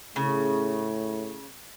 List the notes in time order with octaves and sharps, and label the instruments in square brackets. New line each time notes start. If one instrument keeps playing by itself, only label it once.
[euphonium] A2 [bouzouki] C#3